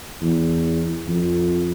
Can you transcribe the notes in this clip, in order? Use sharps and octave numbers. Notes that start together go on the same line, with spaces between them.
E2
F2